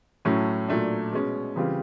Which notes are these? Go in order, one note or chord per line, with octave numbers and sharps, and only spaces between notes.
A2 F#3 A3 C#4
A#2 F#3 A3 D4
B2 G#3 C#4
C#3 E3 G3 C4 F4